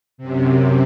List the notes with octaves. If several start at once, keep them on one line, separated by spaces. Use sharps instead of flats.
F#2 C3